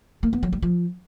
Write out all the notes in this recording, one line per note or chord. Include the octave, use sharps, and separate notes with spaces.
A#3
B3
F#3
G3
F3